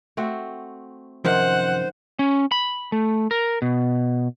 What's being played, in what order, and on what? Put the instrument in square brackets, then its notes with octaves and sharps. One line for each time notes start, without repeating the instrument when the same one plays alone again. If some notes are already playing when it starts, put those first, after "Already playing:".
[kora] A3 C4 F#4
[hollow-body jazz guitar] F#2 C3 F3 [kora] D#3 [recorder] C5 [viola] F#5
[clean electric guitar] C#4
B5
A3
A#4
B2